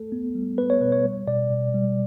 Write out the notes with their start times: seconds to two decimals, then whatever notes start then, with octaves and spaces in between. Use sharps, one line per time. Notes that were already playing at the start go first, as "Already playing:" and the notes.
Already playing: A3 A4
0.12 B3
0.35 G3
0.58 B3 B4
0.70 C#5
0.81 B2 B4
0.92 C#5
1.04 G3
1.27 B2 D5
1.50 B2
1.74 G3